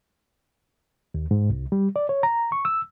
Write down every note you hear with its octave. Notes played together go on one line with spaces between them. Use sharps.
D#2
G#2
C2
G3
D5
C#5
A#5
C#6
E6